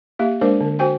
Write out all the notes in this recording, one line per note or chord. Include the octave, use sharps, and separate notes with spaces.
A#3 G4 E5
G#3 A#3 D4 A#4 C5
D3
F#4 C5 G5 G#5